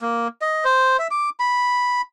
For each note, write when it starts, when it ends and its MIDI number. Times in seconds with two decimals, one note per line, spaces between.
0.02 0.28 58
0.41 0.64 75
0.65 0.97 72
0.99 1.07 76
1.11 1.29 86
1.40 2.01 83